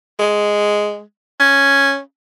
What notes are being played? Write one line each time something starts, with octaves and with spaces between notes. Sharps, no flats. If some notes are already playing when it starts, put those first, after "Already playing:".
G#3
C#4